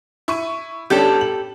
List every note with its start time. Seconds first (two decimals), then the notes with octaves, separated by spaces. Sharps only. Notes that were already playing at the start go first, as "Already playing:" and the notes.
0.28 E4 C#6 D#7
0.90 G1 C#4 D4 G4 A4
1.21 F#7